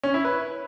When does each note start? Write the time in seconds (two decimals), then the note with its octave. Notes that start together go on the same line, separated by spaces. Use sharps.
0.03 C#4
0.14 E4
0.25 B4